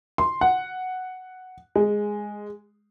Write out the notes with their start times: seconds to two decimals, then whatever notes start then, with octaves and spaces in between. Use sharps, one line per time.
0.18 C6
0.41 F#5
1.75 G#3